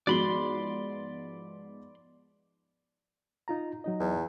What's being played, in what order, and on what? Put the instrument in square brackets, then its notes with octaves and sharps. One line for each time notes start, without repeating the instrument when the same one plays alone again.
[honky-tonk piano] G#2 F3 B3 [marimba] F#4 [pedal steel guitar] D5 B5 C6
[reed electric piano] D#4 F4 A#5
F#3 D#4 D#5
[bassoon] E2